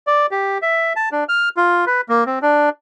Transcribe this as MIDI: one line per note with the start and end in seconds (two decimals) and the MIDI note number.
0.07 0.26 74
0.31 0.58 67
0.62 0.93 76
0.96 1.09 81
1.12 1.24 62
1.29 1.49 89
1.57 1.85 65
1.87 2.01 71
2.09 2.24 58
2.26 2.39 60
2.42 2.69 62